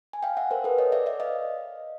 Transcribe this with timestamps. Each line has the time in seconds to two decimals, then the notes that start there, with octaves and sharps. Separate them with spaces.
0.13 G#5
0.23 F5 G5
0.37 E5 F#5
0.51 A#4 C5
0.64 A4 B4
0.78 C#5 D#5
0.92 D5 E5
1.06 D5 E5
1.20 D#5 F5